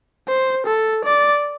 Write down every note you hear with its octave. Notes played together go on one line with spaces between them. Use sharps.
C5
A4
D5